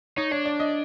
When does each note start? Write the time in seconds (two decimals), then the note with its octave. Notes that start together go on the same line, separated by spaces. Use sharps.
0.17 D#4 C#5
0.32 D4 C#5
0.46 D5
0.60 D#5